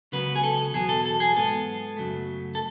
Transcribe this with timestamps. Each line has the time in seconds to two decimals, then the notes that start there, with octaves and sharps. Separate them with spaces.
0.12 C#2 C#3 F#3 B3 B4
0.35 G#4
0.43 A4
0.73 E2 B2 F#3 B3 G#4
0.89 A4
1.05 A4
1.20 G#4
1.35 G#2 G#3 B3 A4
1.97 F#2 C#3 F#3 A3
2.55 A4